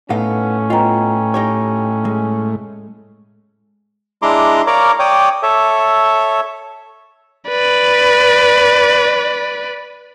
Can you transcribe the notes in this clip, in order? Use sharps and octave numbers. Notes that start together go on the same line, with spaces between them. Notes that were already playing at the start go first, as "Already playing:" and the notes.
A2 B3 C#4 D#4 F5
B3 F4 D#5 G5 A#5
D#4 G4 C#5
G#3
G#3 D4 E4 A#5 C6 D6
A#4 C#5 D5 F5 A#5 D6
C#5 D5 G5 D6 D#6
A4 C#5 E5
B4 D5